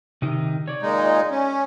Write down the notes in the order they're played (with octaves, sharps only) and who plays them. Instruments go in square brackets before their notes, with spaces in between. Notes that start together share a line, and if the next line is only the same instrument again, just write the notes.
[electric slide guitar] C3 D#3 D#4
C#5 D5
[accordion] A#2 G#3 D#4
C#4